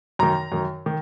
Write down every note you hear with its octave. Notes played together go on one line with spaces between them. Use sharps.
F#2 D#3 A#5
F#2 D#3
D#3